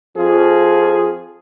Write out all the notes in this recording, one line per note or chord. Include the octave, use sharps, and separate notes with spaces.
F2 F3 F4 G#4